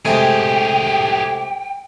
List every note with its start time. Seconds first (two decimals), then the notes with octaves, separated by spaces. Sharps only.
0.05 C3 G#3 A3 G4 G#4 G5